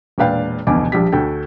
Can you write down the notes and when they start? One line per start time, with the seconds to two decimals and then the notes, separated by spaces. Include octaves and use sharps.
0.18 E1 A#2 D4 B4 F5 G5
0.67 F1 D2 B2 E3 B3 D6
0.92 A#1 F3 G3 G4 B6
1.12 D2 F#4 A4 G5